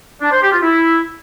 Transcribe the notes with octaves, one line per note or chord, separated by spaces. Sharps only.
D4
C5
G4
F4
E4